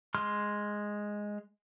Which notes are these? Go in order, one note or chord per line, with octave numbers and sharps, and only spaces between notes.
G#3 C6 F6